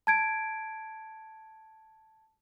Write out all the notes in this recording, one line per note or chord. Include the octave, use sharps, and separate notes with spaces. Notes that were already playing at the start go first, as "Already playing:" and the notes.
A5 G#6 D7